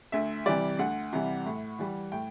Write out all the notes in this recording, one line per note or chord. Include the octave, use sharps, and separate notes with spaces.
D2 E5
C3 E3 G3 D5
D2 F#5
C3 E3 G3
A2
E3 G3
A2 G5